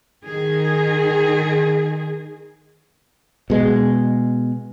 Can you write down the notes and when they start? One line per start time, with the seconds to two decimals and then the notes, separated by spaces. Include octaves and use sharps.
0.24 D#3 G#4
3.50 B2 G#3